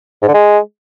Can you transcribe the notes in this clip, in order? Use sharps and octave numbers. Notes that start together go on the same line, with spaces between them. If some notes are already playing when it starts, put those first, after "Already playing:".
G#2
D3
G#3